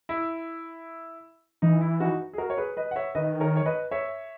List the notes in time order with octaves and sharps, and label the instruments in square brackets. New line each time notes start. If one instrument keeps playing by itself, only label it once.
[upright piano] E4
[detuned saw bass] E3 [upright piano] D#4
[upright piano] E4
D#4 F#4
G#4
F#4 A#4
C#5
G#4 B4
B4 D#5
F#5
C#5 E5
[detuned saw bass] D#3 [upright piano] B4 D#5
[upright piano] A#4 C#5
C#5
B4 D#5
C#5 E5